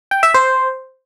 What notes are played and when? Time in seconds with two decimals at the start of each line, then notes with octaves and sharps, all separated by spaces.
0.11 G5
0.23 E5
0.34 C5